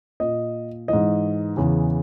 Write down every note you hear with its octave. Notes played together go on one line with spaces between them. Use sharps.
A#2 D#5
G#2 E3 D#5
E2 C#3 E3